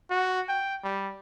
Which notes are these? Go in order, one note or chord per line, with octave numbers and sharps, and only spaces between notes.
F#4
G5
G3